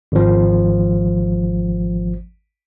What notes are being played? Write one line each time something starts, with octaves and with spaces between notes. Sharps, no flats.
G#1 F3